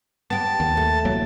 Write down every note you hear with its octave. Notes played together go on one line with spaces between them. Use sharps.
B3 G4 A5
D#2
A3
C2 F#3 A#3